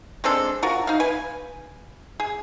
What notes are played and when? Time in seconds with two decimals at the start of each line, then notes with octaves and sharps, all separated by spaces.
0.24 G#3 C4 D4 A4
0.63 F4 F#4 A#4
0.87 D#4 F5
1.00 B4 G#5
2.20 G#4